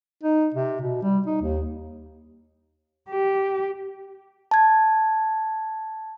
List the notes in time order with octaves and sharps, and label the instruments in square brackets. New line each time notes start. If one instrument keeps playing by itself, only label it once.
[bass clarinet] D#4
C3
B2
G3
D#4
D#2
[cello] G4
[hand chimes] A5 G#6